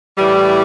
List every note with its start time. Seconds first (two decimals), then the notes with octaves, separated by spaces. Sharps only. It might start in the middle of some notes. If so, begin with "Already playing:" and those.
0.18 A2 E3 G3